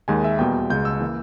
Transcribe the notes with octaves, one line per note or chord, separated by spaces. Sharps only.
D#2 D#3 G#3 G#5
E5
E2 B2 G3 A#3 G5
C#2 C#3 G#3 G6
E6
E3 A#3